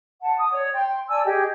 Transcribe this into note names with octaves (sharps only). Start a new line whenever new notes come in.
F#5 A5
D#6
C#5 D5
G5 C6
D5 G#5 A5 E6
G4 G#4 D#5 G5